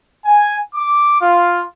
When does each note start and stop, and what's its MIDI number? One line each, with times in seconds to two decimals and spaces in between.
0.25 0.57 80
0.74 1.18 86
1.20 1.63 65